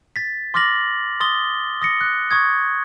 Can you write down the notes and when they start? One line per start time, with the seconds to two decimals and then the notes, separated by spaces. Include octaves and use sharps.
0.16 A6 B6
0.54 C6 D6 F6 A6 A#6 F#7
1.20 C6 D#6 A6 G7
1.82 D#6 A#6 C#7
2.01 F#6
2.31 C#6 D#6 G#6